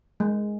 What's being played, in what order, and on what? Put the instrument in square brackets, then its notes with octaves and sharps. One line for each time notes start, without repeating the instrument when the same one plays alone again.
[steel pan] G#3